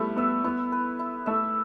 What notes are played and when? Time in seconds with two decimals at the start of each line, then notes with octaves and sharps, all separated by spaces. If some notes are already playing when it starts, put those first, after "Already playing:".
Already playing: G3 A3 B3 E4 B4
0.16 B3 E5
0.44 B3 E4
0.72 B4
0.99 E4
1.26 A3 E5